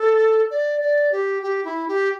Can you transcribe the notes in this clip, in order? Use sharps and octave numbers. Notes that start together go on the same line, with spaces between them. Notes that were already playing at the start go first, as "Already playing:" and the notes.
Already playing: A4
D5
D5
G4
G4
E4
G4